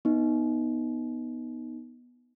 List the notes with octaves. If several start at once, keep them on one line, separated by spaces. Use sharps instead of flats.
B3 D#4